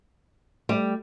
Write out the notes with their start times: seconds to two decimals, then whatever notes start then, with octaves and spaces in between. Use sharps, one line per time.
0.69 G3 A3